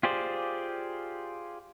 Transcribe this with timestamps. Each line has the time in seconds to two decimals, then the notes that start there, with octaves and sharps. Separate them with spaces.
0.03 F4 G4 G#4 C5 D5